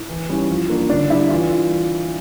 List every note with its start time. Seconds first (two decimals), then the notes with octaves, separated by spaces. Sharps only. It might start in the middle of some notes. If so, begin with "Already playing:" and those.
Already playing: E4
0.09 E3
0.29 G3 C#4 E4
0.50 F3
0.70 A#3 D4
0.90 D3 D4 D5
1.10 G3 D4 E4 E5
1.30 E3 F4 F5